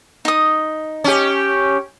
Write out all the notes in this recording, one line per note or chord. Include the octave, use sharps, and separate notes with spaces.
D#4 D#6
C#4 G4